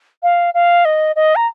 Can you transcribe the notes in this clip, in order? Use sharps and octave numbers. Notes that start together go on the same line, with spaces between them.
F5
F5
D#5
D#5
A#5